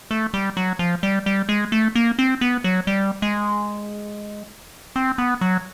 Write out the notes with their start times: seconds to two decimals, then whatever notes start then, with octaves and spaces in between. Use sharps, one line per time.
0.11 A3
0.34 G3
0.57 F#3
0.79 F3
1.03 G3
1.26 G3
1.49 G#3
1.72 A3
1.95 A#3
2.19 C4
2.41 B3
2.64 F#3
2.87 G3
3.22 G#3
4.96 C4
5.18 B3
5.41 F#3